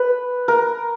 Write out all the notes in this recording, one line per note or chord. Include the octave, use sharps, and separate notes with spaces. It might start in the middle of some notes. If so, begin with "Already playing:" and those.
Already playing: B4
A#4